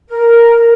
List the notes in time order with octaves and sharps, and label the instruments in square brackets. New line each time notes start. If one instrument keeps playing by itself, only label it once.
[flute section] A#4